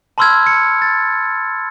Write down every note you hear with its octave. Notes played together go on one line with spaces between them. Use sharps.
A5 B5 C6 E6 F6 G#6
C#7
A6